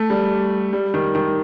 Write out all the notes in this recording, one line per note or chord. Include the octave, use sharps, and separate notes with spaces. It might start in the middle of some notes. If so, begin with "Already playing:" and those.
Already playing: A3
G3
G3
D#3
D#3